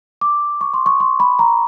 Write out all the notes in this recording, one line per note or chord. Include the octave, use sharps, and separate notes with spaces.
D6
C#6
C6
C#6
C6
B5
A#5